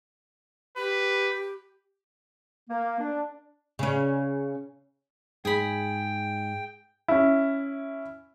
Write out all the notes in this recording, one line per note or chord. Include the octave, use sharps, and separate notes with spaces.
G4 B4
A#3
D4
C#3 C#4
G#2 G#4 G5 B5
C#4 E4